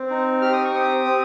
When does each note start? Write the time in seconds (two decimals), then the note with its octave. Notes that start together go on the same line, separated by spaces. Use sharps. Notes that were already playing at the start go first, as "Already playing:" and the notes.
Already playing: C4
0.11 D#4
0.42 G4 F6
0.53 D#6
0.65 C#6
0.74 C4 D#6
1.05 C4